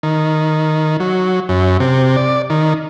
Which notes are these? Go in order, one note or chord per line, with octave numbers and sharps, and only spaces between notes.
D#3
F#3
F#2
C3
D5
D#3